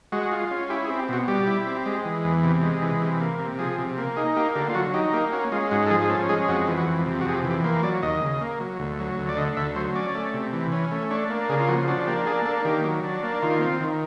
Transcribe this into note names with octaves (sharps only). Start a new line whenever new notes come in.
G#3 F#4
F4
C#4
E4 G4
G#4
C4
G4
B2 F#4
G3 G4
E4
C4
G#3
E3
E2
C3
G#3
E3
C3
A#3
C3
F3 G#4
C3
A#3
D#4 G#4
A#3 G4
D3 G4
F4
F#3 F#4
D#4 G4
A#3 G4
C#4 F#4
G#3 F4
G#2 F#4
A4
F3 G#4
G#4
C#4 A4
G#3 G#4
F2 F#4
E3
F#4
F2
C3
F#4
F2 G#4
G4
E3
G4
A#3 C5
F#3 D5
D#2 D#5
C#3
A#3
F#3
D2
F#3
D2
D5
D3 D#5
D2 E5
F#3 C5
C#4 D5
A3
C3
E3
C#4
A3
D4 C#5
A#3
C#3 G#4
F4
F3 F#4
D4 F#4
A#3 G4
D4 G#4
A#3 A4
D#3 G4
F#3
D4
A#3
D#3 F4
C4
D#3